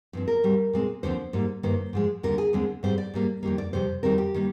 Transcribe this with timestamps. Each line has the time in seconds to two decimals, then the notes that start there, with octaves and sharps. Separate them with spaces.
0.13 G2 F3 C4
0.28 A#4
0.43 G#2 G3 C4
0.73 A#2 G#3 C4
1.03 D#2 D3 F3 C4 C5
1.33 G#2 G3 A#3
1.63 G2 D#3 A#3 C5
1.93 G#2 F3 G#3
2.23 D#2 D3 G3 A#4
2.38 G#4
2.53 D#2 D3 G#3 C4
2.83 G#2 G3 C4 C5
2.98 D5
3.14 G#2 G3 A#3
3.43 F2 D#3 G3 A#3
3.58 D5
3.73 F2 C3 G3 C5
4.03 F2 D#3 G3 C4 A#4
4.18 G4
4.34 D#3 G3 A#3